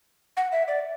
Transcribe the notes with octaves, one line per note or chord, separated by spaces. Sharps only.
F#5
E5
D5